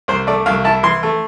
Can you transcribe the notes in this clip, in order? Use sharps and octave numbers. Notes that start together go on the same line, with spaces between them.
C2 C5
A3 D5
C2 F5
E4 A5
E3 C6
A3